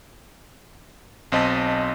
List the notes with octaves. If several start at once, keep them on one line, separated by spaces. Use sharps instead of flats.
B1 C4 D#5 A5 B6